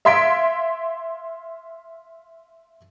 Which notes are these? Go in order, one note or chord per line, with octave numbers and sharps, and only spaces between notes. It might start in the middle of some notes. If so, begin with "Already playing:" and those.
E5 F5 C6 G#6 B6 D7